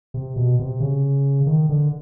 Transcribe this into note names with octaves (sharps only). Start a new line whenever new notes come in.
C3
B2
C3
C#3
D#3
D3